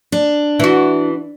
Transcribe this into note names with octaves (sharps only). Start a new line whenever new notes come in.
D4
E3 F#4